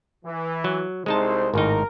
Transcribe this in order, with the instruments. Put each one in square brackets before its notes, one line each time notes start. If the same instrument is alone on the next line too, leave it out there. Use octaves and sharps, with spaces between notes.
[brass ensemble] E3
[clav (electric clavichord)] F#3
[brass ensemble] C2 C5 [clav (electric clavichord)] G#3 D#4 A5
[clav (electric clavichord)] G#1 A2 D#4 [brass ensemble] A#4